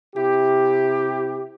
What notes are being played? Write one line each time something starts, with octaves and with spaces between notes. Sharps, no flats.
C3 E4 G4